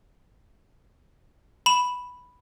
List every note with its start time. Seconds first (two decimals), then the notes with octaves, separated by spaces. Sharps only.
1.66 B5 E7